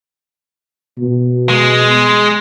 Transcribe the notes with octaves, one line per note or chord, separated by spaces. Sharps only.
B2
G#3